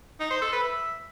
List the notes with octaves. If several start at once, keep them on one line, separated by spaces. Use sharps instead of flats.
D#4
C5
A4
B4
E5